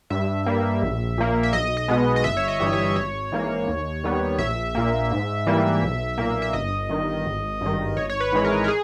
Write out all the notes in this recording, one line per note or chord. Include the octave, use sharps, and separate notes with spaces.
G2 E5
G3 A#3
A#1
A#2 A#3
E5
B1 D#5
D#5
B2 G#3 B3
D#5
G1 E5
C#5
D#5
G2 E3 G3
C#5
G#1 C#5
G#2 E3 A#3
D#2
D#3 G3 B3
A#1 E5
A#2 A#3
G#2
E3 G3 A#3
B1
A#2 A#3
E5
G1 D#5
G2 D#3
G#1
G2 D#3
G#1 C#5
C#5
B4
G#2 E3 G#3
A#4
A#4
G#4